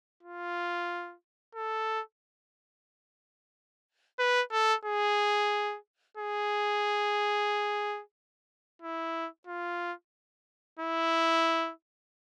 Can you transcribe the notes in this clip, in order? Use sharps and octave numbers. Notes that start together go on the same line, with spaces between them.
F4
A4
B4
A4
G#4
G#4
E4
F4
E4